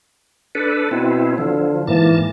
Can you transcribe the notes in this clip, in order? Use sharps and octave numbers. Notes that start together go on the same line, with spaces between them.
D4 A4 B4
B2 C4 E4
D3 F3
G#2 E3 A#3 A5